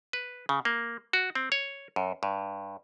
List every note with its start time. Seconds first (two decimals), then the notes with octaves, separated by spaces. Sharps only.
0.13 B4
0.49 C#3
0.65 A#3
1.13 F#4
1.35 C4
1.52 C#5
1.96 F#2
2.23 G2